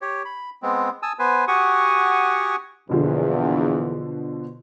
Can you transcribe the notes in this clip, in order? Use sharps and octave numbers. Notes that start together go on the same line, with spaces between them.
G4 C#5
B5
G#3 B3 C4
G#5 A5 D#6 E6
B3 B4 C5 G#5
F#4 G4 F#5 G#5 C#6 D#6
A#1 E2 B2 D3 F3